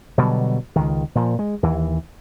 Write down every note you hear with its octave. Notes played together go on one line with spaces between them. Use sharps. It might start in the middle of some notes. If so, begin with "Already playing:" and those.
B2 D3 F#3 G3
C#2 D#3
A#2 F3
G#3
D#2 E3